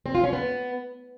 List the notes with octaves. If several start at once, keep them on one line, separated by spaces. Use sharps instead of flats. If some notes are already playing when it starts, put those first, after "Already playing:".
C4
F4
C#4
B3